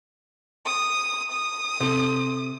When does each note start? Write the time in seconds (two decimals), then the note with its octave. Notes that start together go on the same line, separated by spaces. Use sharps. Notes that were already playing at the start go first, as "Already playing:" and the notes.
0.66 D#6
1.32 D#6
1.80 C3 A4